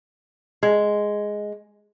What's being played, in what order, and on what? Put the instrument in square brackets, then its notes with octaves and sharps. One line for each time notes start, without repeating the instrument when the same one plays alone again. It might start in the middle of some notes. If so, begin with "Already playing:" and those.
[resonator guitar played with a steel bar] G#3